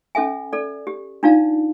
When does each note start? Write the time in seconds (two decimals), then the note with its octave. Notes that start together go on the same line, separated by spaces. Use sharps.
0.15 C#4 A4 E5 G#5
0.53 A4 D5
0.87 G4
1.23 D4 D#4 F4 D5 F5 A5